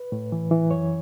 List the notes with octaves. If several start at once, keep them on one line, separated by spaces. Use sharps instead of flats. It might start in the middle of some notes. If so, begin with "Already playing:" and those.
Already playing: B4
A2
E3
E3
F#2 C#5